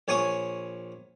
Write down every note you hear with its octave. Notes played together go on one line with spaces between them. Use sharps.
A#1 C#5 G#5 C#6 D#6